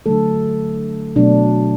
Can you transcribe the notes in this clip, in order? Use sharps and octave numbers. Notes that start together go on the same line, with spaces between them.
D3 F#3 A3 A4
B2 F#3 A3 D4